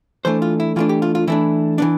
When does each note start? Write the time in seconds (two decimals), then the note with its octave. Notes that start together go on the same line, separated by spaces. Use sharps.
0.25 E3 A3 D4 C5
0.42 F4
0.60 E4
0.76 E3 A3 D4 F4
0.89 G4
1.02 F4
1.15 F4
1.28 E3 A3 D4 E4
1.78 E3 B3 D4